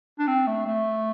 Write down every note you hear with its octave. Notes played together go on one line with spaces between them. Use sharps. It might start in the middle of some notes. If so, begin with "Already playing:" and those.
D4
C4
A3
A3